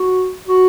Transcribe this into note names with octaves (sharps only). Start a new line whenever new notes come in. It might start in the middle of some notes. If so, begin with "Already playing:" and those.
Already playing: F#4
F#4